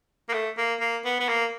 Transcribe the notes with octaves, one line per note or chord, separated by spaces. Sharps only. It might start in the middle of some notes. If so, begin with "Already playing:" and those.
A#3
A3
A#3
A#3
B3
B3
A#3